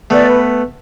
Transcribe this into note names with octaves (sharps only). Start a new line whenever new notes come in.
A3 B3 D5
B4